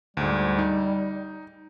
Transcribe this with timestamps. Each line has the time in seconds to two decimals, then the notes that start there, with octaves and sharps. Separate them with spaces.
0.17 D2 G#2 G3
0.59 D#4